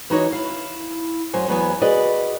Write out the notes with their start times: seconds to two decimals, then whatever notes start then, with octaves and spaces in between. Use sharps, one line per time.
0.10 E3 D#4 F#4 C#5 D#5
0.32 E4 F5
1.33 F#2 C5 C#5 G#5
1.48 E2 F#3 B3 G#5
1.82 F#4 G#4 B4 D5 D#5